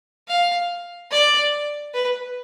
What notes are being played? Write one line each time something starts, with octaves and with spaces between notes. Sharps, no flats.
F5
D5
B4